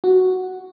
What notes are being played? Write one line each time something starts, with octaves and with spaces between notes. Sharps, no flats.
F#4